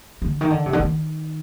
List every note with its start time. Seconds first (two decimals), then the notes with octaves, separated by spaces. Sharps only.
0.22 D3
0.41 D#3
0.50 D3
0.66 C3
0.73 D3
0.80 D#3